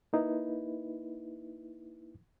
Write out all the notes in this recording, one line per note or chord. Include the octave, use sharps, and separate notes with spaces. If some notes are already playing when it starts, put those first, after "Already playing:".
A#3 D#4 E4 B4